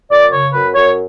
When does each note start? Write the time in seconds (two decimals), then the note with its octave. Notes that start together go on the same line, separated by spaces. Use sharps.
0.11 F#2 D5
0.32 C#3 C#5
0.53 F#2 B4
0.75 F#2 C#5